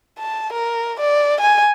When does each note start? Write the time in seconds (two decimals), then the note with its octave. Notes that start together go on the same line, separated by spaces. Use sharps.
0.19 A5
0.53 A#4
1.00 D5
1.41 G#5